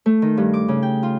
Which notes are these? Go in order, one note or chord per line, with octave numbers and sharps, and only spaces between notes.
A3
D#3
G2
D6
C#3
G5
F4